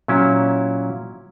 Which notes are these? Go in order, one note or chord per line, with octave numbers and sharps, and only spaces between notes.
A#2 F#3 C#4 E4